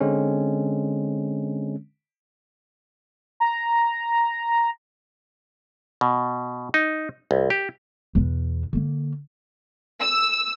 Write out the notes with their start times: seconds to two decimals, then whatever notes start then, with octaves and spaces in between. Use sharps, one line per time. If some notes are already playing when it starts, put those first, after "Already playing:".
0.01 D3 G#3 C4 C#4
3.40 A#5
6.01 B2
6.74 D#4
7.31 C2
7.50 G4
8.15 E2 B2
8.73 D3 A#3
10.00 E6